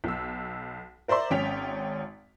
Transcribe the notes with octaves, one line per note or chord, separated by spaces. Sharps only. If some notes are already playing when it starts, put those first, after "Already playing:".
B1 E6
A#4 C5 D5 E5 C6
G#1 C#4 G5 B6 F7